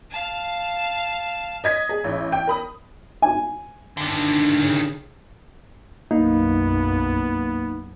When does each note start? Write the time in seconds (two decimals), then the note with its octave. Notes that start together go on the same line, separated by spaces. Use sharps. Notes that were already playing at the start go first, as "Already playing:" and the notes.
0.11 F5 A5
1.64 D#5 G#6 B6
1.89 G#4
2.04 A1
2.32 G5
2.47 A#4 B5 D#6
3.22 G#5
3.97 D3 D#3 D4 G5 A5
4.61 A#2 C#3 G4
6.11 B1 F#2 A#3 B3 D#4